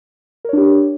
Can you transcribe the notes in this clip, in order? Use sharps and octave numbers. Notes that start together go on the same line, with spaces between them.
D4 G4 A#4 C#5